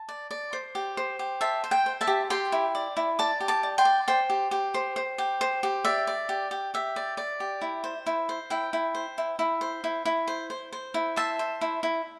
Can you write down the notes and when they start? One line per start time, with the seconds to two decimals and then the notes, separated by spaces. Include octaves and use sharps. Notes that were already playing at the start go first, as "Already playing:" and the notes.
Already playing: A5
0.09 D5
0.31 D5
0.53 C5
0.75 G4
0.97 C5
1.19 G4
1.41 C5 E5 A5
1.64 C5
1.71 G5
1.86 C5
2.01 E5 A5
2.07 G4
2.30 G4 G5 C6
2.52 E4
2.75 D5
2.97 E4
3.19 D5 A5 D6
3.40 G4
3.48 A5 D6
3.63 D5
3.78 G5 C6
3.85 D5
4.08 C5 G5
4.30 G4
4.51 G4
4.74 C5
4.96 C5
5.18 G4
5.41 C5
5.63 G4
5.85 D5 E5
6.07 D5
6.29 G4
6.51 G4
6.74 G4 E5
6.96 D5
7.17 D5
7.40 G4
7.62 E4
7.84 C5
8.06 E4
8.29 C5
8.50 E4 G5
8.73 E4
8.95 C5
9.18 E4
9.39 E4
9.61 C5
9.84 E4
10.05 E4
10.27 C5
10.50 C5
10.72 C5
10.94 E4
11.16 C5 E5 A5
11.39 C5
11.61 E4
11.83 E4